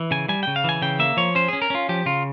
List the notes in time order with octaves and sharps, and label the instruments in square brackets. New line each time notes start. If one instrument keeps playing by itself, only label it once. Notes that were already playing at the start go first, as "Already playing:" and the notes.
Already playing: [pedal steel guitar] E3
C#3 G#5
G3 G#5
C#3 G5
F5
E3 G#5
C#3 G5
A#3 E5
F3 C#5
C#4 C5
C#4 G#4
A#4
C#4 F4
F3 G4
C#3 F4